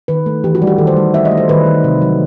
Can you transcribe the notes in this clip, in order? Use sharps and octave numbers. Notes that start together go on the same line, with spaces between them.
D#3 B4
A3
E3 G4
F#4
G3
G4
D#3 A4
C5
G3
A3 E5
D#5
A3
C5
D#3 B4
D#3
C3
F#3